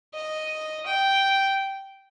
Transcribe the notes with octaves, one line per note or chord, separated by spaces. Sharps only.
D#5
G5